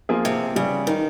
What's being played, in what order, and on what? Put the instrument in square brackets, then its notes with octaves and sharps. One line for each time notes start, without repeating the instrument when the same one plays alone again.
[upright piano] F3 A#3 F4 G#4
[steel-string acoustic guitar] C3
[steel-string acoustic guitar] C#3 [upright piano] G3
[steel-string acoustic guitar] D#3